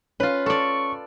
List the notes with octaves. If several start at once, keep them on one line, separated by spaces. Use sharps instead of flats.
C#4 F4 B4
A4 D5 C#6